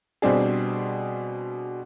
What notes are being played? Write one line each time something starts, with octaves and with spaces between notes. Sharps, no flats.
B2 G3 C4 D4 G#4